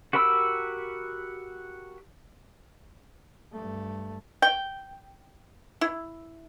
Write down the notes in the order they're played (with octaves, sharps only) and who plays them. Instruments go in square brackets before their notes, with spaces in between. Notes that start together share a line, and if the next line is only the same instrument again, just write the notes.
[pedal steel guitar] F#4 G4 A#4 B5 E6
[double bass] G2 A3
[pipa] G5
E4